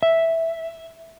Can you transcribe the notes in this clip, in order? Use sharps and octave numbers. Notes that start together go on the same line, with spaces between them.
E5